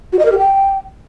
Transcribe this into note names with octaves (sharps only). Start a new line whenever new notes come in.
F#4
D#5
A#4
G4
G5